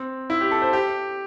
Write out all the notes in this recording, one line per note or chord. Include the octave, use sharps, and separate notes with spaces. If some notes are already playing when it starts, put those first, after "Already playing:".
Already playing: C4
E4
G4
A4
C5
G4